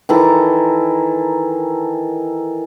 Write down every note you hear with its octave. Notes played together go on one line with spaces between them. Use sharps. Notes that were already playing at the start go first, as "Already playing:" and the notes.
D#3 E3 A4 A#5